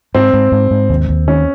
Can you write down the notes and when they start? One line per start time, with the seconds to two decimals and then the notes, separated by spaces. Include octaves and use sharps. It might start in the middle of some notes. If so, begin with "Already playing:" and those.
0.15 G#2 C4
0.33 G#2
0.52 G#2
0.71 G#2
0.89 D#2
1.09 D#2
1.27 D#3 C#4